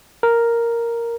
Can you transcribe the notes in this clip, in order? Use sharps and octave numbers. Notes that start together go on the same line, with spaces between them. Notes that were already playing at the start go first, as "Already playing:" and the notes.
A#4